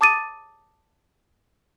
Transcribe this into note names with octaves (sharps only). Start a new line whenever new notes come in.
A5 D6 D#6 A6 D#7